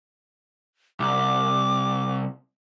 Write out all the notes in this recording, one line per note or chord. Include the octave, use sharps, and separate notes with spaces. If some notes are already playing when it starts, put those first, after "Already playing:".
C2 D6